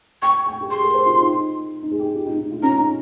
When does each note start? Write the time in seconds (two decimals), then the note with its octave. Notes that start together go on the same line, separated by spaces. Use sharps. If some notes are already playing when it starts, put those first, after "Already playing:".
0.22 G5 C#6
0.46 G5
0.61 G4
0.70 G#4 C6
0.83 A#4
0.94 C5
1.06 F4
1.19 D#4
1.83 D#4
1.91 G#4
1.99 G4
2.15 F4
2.26 D#4
2.38 D#4
2.51 F4
2.63 C#4 A#5
2.79 D#4